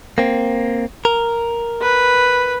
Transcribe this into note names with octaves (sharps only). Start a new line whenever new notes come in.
A#3 C4
A#4
B4